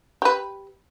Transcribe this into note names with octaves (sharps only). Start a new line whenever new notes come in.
G4 B4